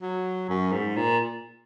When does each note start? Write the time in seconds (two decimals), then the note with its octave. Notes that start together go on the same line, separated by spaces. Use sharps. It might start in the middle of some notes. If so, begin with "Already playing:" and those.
0.02 F#3
0.49 F#2
0.72 G#2
0.96 A#2